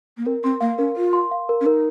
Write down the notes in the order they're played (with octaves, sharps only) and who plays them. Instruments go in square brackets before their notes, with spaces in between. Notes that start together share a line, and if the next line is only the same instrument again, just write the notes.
[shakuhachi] A#3
[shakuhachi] C4 [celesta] A#4
[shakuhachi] C4 [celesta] C6
[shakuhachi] A#3 [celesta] F5
[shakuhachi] C#4 [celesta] A#4
[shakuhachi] F4 [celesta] A#4
[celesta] C6
F5
A#4
[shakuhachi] C#4
[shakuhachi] D#4 [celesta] A#4